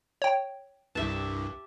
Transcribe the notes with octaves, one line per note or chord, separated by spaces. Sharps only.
C#5 G5
C2 G2 G4 E5 A5